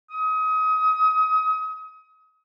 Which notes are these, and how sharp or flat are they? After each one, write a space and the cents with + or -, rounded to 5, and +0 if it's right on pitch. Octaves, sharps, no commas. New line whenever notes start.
D#6 +30